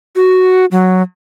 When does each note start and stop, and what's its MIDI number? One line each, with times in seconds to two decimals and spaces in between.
0.16 0.65 66
0.71 1.02 54